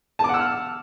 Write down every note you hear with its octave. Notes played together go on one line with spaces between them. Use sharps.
F#5 A5 D6 E6 F6